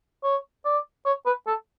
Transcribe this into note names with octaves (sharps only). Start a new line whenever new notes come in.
C#5
D5
C#5
B4
A4